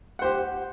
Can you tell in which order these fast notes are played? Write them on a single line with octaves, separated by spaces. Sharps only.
F#5 C5 G4